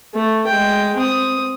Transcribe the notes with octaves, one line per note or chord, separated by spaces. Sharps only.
A3
G#3 G5
C4 D#6